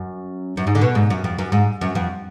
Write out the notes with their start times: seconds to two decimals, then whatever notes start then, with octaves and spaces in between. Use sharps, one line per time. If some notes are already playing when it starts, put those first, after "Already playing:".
Already playing: F#2
0.57 F#2
0.67 G#2
0.75 D3
0.81 B2
0.95 G#2
1.10 F#2
1.24 F2
1.39 F#2
1.52 G#2
1.81 F#2
1.95 F2